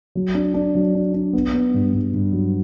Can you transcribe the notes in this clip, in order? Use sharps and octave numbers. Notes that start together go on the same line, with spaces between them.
F#3
D4
D4
F#3
D4
D4
B3
B3
G2
G2
G2
F#3